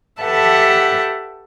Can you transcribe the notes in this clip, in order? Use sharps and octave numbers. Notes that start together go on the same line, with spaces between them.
G4 A4 B4 E5 F#5 A5